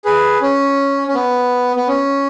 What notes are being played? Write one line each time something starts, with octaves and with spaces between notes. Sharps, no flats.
G#4 B4
C#4
C#4
B3
B3
C#4